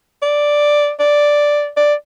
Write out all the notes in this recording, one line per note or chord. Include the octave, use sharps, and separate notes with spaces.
D5
D5
D5